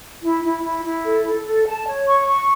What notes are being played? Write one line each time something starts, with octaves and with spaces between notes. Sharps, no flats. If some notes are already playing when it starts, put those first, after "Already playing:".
E4
E4
E4
E4
A4
A4
A4
A5
C#5
C#6
C#6